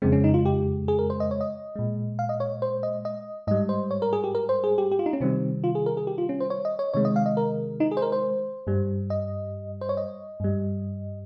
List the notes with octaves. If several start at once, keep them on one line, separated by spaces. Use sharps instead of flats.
F2 C#3 G#3 C4
C#4
D#4
F4
G4
G#4
A#4
C5
D#5
C#5
D#5
A#2 G#3
F5
D#5
C#5
C5
D#5
D#5
G#2 G3 D#5
C5
C#5
A#4
G#4
G4
A#4
C5
G#4
G4
G4
F4
D#4
C#4
C3 D#3 G3 C4
F4
G#4
A#4
G#4
G4
F4
C#4
C5
C#5
D#5
C#5
C3 D#3 G#3 C#5
D#5
F5
D#5
A#4
D#4
G#4
C5
A#4
C5
G2 G3
D#5
C5
C#5
D#5
G2 G3